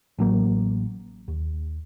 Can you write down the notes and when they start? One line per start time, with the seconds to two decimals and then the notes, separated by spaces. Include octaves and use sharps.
0.18 A1 F#3 A#3
1.28 D#2